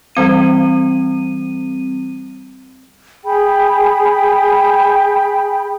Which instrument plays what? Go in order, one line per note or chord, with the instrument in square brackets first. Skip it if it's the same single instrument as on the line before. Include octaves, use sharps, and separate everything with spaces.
[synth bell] E3 G3 C4 D#7
[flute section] G#4 G5 B5